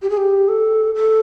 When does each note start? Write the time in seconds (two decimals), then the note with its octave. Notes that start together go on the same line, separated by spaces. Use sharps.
0.02 G4
0.10 G#4
0.17 G4
0.48 A4
0.95 A4